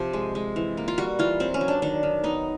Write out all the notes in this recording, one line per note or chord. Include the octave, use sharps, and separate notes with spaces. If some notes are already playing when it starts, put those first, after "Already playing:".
Already playing: C3 F3 G4
G#3
G#3
E3
A#3
F4
G3 F#4
E3 F4
F#3 C4
C#4
F#3
D4
D#3 D4
D#3
B3 D#4